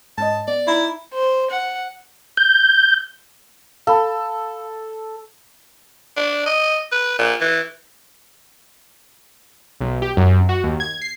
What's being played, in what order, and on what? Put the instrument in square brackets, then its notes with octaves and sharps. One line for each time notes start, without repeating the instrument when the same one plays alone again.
[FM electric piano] G#2 C#4 D#5 [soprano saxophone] A5
[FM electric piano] B3 [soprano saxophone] D5
[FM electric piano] D#4 A#5 C6 [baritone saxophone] E4
[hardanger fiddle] C5
F#5
[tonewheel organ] G6
[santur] A4 [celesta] F5 B5
[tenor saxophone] D4
D#5
B4
A#2
E3
[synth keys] B1
G4
F#2
F#4
D#2
G#6
C7